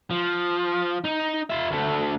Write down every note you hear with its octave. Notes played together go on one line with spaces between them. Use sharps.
F3
D#4
F4 E5
D2 A3